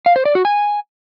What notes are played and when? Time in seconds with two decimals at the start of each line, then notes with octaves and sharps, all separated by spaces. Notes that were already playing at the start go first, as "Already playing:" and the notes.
0.06 F5
0.16 C5
0.25 D5
0.35 F#4
0.45 G#5